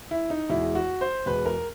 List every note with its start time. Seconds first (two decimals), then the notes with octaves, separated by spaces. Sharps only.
0.11 E4
0.30 D#4
0.50 E2 B2 G#3 E4
0.75 F#4
1.01 C5
1.26 E2 B2 G#3 B4
1.46 A#4